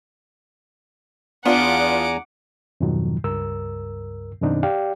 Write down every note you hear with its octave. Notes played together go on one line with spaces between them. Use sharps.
E2 B3 D4 F4 F#5 G#5 A#5 D6
F2 G#2 B2 D#3 F3 F#3
C#2 G2 A#4 E6
F#2 B2 D#3 C4 D4 D#4
G4 D5 F5 G5